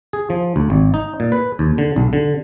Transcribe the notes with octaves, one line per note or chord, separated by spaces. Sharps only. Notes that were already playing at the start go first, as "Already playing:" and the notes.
G#4
F3
D2
G#1
D#4
A#2
B4
D#2
D3
B1
D3